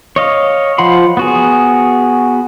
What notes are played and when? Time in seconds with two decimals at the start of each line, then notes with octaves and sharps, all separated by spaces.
0.16 C#5 D#5 F5
0.78 F3 C5 F#5 B5 C6
1.17 B3 F#4 G#4